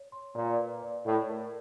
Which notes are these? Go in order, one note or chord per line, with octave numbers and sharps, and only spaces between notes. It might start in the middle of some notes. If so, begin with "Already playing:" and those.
Already playing: C#5
C6
A#2 D5
B4
D5
A2 D5
A#4